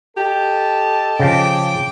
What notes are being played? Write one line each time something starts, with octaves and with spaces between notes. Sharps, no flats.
G4 A4 D#5 A5
C#3 F3 G5 D6